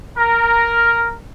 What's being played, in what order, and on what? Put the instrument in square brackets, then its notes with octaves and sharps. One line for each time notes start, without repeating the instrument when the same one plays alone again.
[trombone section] A#4